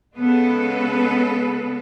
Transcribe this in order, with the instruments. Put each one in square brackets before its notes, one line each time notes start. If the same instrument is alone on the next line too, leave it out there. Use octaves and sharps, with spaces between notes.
[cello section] C#3 G#3 B3 A4 B4